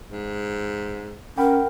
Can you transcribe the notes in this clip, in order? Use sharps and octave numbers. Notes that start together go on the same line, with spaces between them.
G#2
C#4 A#4 F#5 G5 B5